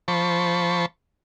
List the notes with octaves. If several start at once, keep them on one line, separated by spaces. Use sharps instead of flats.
F3 C5 A5 B5 C#6